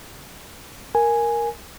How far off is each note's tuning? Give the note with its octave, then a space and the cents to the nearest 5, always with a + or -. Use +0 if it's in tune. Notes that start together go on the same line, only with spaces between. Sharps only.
A#4 +0 G#5 +0